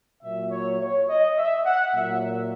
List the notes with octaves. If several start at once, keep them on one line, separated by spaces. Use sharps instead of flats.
A#2 F#3 E5
C#5
C#5
D#5
E5
F#5
A#2 F#3 E5